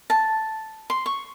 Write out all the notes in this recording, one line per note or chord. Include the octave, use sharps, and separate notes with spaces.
A5
C6
C#6